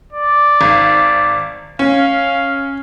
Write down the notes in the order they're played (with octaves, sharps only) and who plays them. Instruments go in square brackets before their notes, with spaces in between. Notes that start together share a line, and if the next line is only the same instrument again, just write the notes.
[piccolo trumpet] D5
[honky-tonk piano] G#1
[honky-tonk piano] C#4 [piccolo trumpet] F5